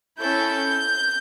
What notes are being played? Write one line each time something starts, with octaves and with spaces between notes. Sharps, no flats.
C#4 E4 A4 G6